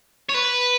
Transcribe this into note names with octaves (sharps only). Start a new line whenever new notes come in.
C#5
B4